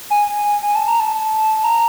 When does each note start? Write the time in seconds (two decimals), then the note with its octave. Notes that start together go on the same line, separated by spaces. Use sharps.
0.10 G#5
0.62 G#5
0.75 A5
0.88 A#5
1.00 A5
1.13 A5
1.64 A#5